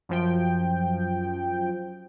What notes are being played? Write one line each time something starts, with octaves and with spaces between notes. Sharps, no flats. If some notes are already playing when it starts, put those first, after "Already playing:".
F#2 F3 G5